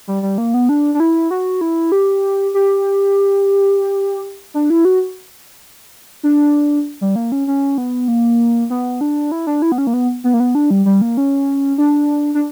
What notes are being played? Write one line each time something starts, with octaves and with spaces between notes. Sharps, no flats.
G3
G3
A#3
B3
D4
D4
E4
F#4
E4
G4
G4
D4
E4
F#4
D4
G3
A#3
C#4
C#4
B3
A#3
B3
D4
E4
D4
E4
B3
C#4
A#3
B3
B3
A#3
B3
D4
G3
G3
A#3
C#4
D4
D4